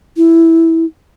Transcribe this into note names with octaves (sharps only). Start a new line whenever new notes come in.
E4